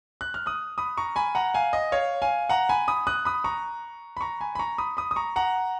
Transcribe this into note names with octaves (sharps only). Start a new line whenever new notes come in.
F#6
F6
D#6 F#6
B5 D#6
A#5 C#6
G#5 B5
F#5 A#5
F5 G#5
D#5
C#5 F5
F5 G#5
F#5 A#5
G#5 B5
B5 D#6
D#6 F#6
B5 D#6
A#5 C#6
B5
A#5 C#6
G#5 B5
B5
A#5 C#6
B5 D#6
B5 D#6
D#6
A#5 C#6
F#5 A#5